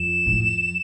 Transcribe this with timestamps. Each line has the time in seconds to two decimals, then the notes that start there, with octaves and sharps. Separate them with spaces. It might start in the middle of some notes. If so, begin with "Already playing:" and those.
Already playing: F2 E7
0.26 A2